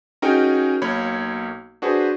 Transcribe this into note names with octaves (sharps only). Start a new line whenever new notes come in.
C#4 D#4 F#4 G#4 A#4 G5
B1 A#3 C#5 B5
D4 F#4 G#4 B4 C5